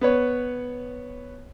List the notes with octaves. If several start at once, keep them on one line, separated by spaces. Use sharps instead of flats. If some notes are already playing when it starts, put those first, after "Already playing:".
B3 B4 C#5